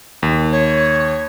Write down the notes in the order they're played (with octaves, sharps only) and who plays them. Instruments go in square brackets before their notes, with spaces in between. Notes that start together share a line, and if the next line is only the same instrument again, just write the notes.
[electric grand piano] D#2
[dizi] C#5